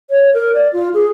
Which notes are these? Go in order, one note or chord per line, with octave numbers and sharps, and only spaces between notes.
C#5
A#4
D5
F4
G#4